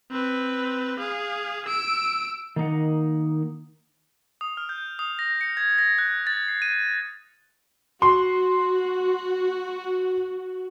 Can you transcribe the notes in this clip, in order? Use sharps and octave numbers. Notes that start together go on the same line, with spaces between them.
C4 B4
G#4 F5
E6 D7
D#3 A#3 D#4 F#5
D#6
F6
G6
D#6
A#6
C#7
G#6
A#6
F#6
A6
C7
D#7
F#4 C6